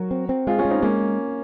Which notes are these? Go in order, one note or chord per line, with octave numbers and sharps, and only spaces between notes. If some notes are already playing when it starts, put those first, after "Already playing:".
Already playing: F#3 F#4 A#4
C4
C4
G#3 F4 G#4
C#4 F4
G#3
C4 D#4
G#3 A#3 C#4